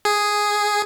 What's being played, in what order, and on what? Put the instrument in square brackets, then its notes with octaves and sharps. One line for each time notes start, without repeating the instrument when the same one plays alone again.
[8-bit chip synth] G#4